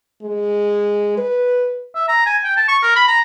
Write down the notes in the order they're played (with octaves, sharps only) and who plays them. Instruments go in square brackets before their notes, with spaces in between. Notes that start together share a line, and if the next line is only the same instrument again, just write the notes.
[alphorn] G#3
B4
[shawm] E5
A#5
G#5
G5
A5
C#6
A#4
B5
A#5